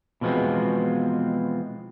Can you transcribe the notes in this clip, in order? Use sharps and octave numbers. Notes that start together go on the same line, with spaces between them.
B2 E3 F3 G#3 B3 C4